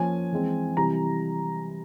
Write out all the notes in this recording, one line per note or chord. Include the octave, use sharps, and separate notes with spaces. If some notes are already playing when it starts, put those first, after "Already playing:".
Already playing: F3 A#3 C#4 G#5
E3 G#3 C4
C3 E3 G3 A#5